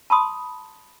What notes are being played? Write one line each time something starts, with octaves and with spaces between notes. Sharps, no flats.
A5 B5 C6 D#6